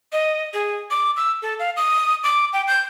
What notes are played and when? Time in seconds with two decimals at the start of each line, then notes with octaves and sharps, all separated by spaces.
0.13 D#5
0.54 G#4
0.91 D6
1.16 E6
1.42 A4
1.59 F5
1.77 D#6
2.24 D6
2.53 G5
2.67 G6